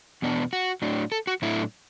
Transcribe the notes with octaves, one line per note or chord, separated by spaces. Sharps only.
E2 B2 B3 D4
F#4
A2 F#3 D4
A4
F#4
A2 F#3 A3 D4 E4